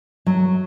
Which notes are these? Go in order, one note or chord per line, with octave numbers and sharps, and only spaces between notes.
F#3